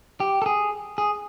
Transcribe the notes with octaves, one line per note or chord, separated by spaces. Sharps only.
G4
A4
G#4
G#4